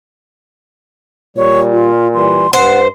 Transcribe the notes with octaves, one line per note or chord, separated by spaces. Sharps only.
A#2 G3 C#5
F4
E3 G3 C6
G2 C5 F#5